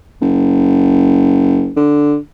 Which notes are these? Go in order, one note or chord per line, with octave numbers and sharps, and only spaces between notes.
F#1
D3